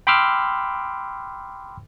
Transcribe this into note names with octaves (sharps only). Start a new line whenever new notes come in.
G5 B5 C6 D6 E6 F6